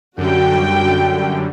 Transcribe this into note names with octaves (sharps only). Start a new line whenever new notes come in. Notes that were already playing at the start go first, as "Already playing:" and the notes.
F#2 D3 G3 F#4 G5